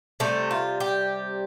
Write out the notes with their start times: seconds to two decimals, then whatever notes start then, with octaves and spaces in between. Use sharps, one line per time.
0.20 C3 G3 A3
0.51 F4
0.80 G4